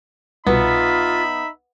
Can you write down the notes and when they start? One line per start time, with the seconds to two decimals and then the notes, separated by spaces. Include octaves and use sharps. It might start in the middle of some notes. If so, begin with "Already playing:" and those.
0.47 C2 B2 B3 D#4 F4 E5 B5